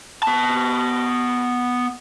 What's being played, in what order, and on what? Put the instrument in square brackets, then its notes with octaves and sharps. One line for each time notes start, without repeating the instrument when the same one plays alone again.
[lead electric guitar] B3 A5